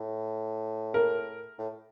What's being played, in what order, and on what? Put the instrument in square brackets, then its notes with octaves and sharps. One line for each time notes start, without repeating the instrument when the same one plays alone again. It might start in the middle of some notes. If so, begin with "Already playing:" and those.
Already playing: [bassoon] A2
[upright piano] A#4
[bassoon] A2